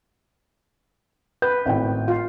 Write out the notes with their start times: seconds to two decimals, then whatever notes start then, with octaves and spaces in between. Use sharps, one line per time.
1.42 B4 G6
1.66 G#1 A2 G5
2.08 F4